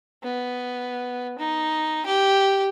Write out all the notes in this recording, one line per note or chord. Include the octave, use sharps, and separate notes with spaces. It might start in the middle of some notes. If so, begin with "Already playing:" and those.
B3
D#4
G4